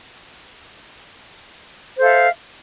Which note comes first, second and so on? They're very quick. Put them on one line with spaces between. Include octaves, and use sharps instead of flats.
C5 A4 F5 E5